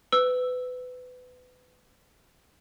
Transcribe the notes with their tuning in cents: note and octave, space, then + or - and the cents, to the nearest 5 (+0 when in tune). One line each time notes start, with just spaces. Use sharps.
B4 +25 E6 +0